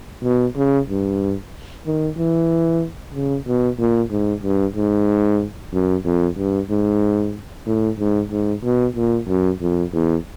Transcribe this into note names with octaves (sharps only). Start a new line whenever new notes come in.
B2
C#3
G2
D#3
E3
C#3
B2
A#2
G#2
G2
G#2
F#2
F2
G2
G#2
A2
G#2
G#2
B2
A#2
F#2
F2
E2